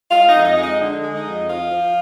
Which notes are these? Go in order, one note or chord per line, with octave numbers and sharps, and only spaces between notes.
G#3 F4 F5
D#4 D#5
F2
D#4 D#5
G#3
D#4 D#5
D3
G#3
D#4 D#5
F2
F3 F4 F5
F3